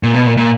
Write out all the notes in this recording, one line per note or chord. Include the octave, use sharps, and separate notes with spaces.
A#2
B2
A#2
A#2